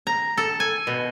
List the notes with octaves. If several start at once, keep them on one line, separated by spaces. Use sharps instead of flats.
A#5
A4
G#5
B2